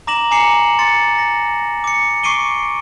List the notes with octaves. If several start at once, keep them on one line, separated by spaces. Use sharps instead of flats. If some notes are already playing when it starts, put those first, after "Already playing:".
A#5 D6 A#6 E7 F#7
G#5 A#5 D6 C7 C#7 F#7
C6 A6 C#7
A#6
D6 C#7
C#6 D6 C7 D7 D#7 G7